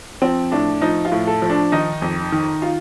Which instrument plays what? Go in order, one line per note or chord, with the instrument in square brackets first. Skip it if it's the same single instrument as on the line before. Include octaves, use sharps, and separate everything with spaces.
[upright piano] F3 C4
A2 D4
F3 D#4
F4
A2
A4
F3
D4
D#3 D#4
F2
D#3
F4